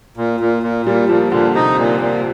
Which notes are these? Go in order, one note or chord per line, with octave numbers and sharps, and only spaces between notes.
A#2
A#2
A#2
A#2 G3
A#2 F3
A#2 D3
C3 D#4
A#2
A#2